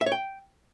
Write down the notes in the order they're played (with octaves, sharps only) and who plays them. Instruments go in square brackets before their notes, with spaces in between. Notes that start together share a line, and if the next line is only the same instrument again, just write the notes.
[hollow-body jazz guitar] E5
C#5
G5